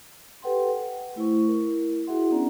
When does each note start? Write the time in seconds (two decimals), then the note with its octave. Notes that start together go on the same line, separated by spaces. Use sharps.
0.42 G4 A4 B4 F#5 G5 C6
0.76 F#5
1.16 A3 E4 C5 C#6
1.45 E4 A#4
2.07 E4 F#4 G#4 E5 F#5 C6
2.30 B3 C#4 D4 D5 A#5